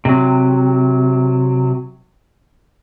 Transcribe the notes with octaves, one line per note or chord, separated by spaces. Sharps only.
C3 F#3